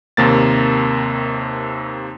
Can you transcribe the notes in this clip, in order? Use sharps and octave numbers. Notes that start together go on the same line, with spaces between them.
D#2 C3 A#3 A6